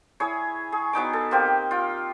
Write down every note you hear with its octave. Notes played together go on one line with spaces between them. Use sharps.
E4 G#4 C#5
G#4
F#3 B3 D#4 D6
A4
A#3 C4 G4
F4 G5